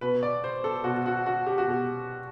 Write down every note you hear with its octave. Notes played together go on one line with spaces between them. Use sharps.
B2 B4
D5
C5
A4
B2 F#4
F#4
F#4
G4
F#4
B2 G4